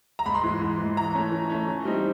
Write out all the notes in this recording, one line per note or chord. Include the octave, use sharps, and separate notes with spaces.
A#5
G#2 B5
C6
E3 G#3
G#2
E3
G#3
E3 A#5
A3 C#4
E3
A3 C#4
E3
G3 C4 D#4